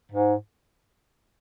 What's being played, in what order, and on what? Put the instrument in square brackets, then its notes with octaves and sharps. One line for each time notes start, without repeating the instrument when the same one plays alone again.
[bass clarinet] G#2